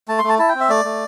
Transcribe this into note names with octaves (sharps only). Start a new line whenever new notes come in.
A3 A5
C6
A3 A5
E4 A5
G5
C4
E5
A3 D5
A3